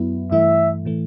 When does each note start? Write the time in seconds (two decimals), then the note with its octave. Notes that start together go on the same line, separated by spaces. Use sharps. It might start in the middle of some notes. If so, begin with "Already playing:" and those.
Already playing: F#2 F#3 B3 E4
0.31 G2 E3 A3 E4 E5
0.85 A2 E3 A3